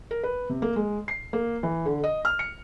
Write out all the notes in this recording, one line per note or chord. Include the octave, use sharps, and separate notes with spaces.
A#4
B4
C3
A#3
G#3
C7
A#3
E3
D3
D#5
F6
C#7